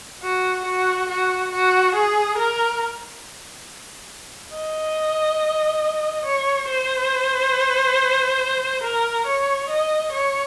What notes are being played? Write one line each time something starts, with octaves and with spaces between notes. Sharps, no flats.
F#4
F#4
F#4
F#4
G#4
A#4
D#5
C#5
C5
A#4
C#5
D#5
C#5